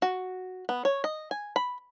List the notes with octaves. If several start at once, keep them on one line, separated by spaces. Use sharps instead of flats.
F#4
B3
C#5
D#5
G#5
B5